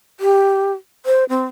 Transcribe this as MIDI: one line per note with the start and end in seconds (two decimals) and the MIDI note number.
0.20 0.72 67
1.06 1.24 72
1.29 1.45 60